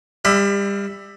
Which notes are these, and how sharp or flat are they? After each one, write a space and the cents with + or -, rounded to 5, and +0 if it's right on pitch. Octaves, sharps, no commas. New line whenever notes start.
G3 +30 E5 +5 B5 +45